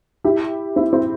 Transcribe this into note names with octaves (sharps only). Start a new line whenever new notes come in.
E4 G4
C4 E4
C4 E4